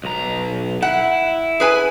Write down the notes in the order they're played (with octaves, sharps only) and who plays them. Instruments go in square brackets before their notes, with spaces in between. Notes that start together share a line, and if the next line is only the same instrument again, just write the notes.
[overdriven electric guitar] B1 A#5
[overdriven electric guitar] E4 [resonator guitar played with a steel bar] F#5
[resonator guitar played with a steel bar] G#4 B4 G#5